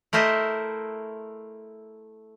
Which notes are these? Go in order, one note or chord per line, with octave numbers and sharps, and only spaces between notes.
A3 E4 A#4 C5 D#5 E5